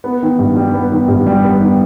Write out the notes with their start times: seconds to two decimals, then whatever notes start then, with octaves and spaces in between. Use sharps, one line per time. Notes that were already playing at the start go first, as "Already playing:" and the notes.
0.04 B3
0.22 D#3
0.39 G2
0.56 G3
0.74 B3
0.92 D#3
1.08 G2
1.26 G3
1.44 B3
1.61 D#3